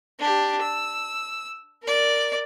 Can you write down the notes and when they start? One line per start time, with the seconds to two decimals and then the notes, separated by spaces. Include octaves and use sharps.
0.19 D4 G4
0.62 E6
1.83 A#4 D5